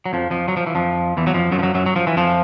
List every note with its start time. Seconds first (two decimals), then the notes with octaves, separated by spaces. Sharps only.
0.06 F#3
0.13 F2 F3
0.30 F2 F3
0.48 F#3
0.57 F3
0.67 E3
0.75 F2 F3
1.17 E2 E3
1.27 F#3
1.34 F2 F3
1.52 F#2 F#3
1.59 F3
1.63 F#2 F#3
1.75 F#2 F#3
1.86 F#3
1.96 F3
2.07 E3
2.16 F2 F3